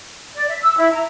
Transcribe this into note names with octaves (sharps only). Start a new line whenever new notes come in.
D5
E5
E6
E4
A#5